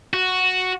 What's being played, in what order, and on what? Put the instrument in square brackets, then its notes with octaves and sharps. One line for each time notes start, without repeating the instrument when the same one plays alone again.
[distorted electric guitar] F#4